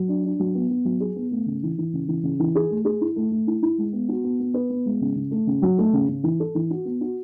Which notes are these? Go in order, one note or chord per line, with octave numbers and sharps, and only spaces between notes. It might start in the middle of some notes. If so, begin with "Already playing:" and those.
Already playing: F#3
D4
D4
F#3
B3
B3
F#3
G#4
B3
A3
C#3
E3
E3
C#3
E3
C#3
E3
G#4
A3
G#4
E4
A3
A3
E4
E4
G#3
B3
F#4
B3
B3
B4
B3
G#3
C#3
C#3
A3
C#3
F#3
A3
C#3
C#3
E3
A4
E3
F#4
B3
F#4